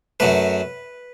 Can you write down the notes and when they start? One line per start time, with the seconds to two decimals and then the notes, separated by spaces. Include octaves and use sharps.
0.20 F#2 F#3 A3 B4